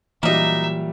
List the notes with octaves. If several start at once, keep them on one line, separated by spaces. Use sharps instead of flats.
A#2 E3 F#3 G3 A#3 D#4 E5